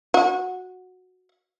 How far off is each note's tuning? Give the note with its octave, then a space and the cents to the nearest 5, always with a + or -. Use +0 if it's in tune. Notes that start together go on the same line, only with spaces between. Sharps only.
F#4 -10